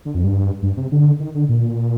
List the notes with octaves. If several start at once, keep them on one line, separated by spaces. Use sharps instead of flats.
D3
F2
G2
G2
C3
D3
D#3
D3
A#2